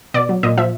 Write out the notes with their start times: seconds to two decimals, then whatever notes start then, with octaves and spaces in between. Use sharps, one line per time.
0.14 B2 D5
0.29 F#3
0.43 A#2 D#5
0.57 F3 E5